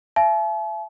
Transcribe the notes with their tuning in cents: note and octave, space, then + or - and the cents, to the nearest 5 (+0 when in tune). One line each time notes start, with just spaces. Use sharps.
E5 +40 A5 -45